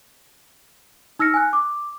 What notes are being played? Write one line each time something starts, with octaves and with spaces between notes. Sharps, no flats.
D#4 E6 F6 A#6 C#7
G#5 F#6
D6